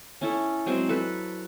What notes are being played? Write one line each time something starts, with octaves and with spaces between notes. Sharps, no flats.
C#4 E4 A4
F#3 G#3 C4
A4 B4